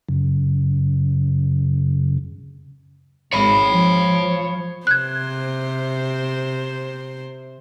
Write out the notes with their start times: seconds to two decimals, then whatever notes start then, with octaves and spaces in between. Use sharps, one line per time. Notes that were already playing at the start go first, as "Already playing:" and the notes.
0.09 F#2 C#3
3.33 G#1 C#5 B5
3.72 F3
4.87 C3 C5 F#6 G#6